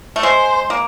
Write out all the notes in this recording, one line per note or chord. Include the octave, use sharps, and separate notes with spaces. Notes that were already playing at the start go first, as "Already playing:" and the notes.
A3
G#3 C5
A#3